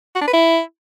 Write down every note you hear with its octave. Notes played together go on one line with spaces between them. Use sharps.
F#4
D4
B4
E4